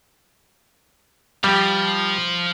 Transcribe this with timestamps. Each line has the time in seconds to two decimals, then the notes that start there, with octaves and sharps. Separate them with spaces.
1.44 F3 G3 G4